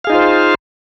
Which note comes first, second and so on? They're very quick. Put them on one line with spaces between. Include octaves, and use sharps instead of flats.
F5 G#4 D#4 F4 C5